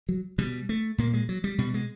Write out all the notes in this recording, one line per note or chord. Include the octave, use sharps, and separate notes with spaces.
F#3
B2 G3
A3
A#2 A#3
G#3
F#3
G3
B2 G3
G#3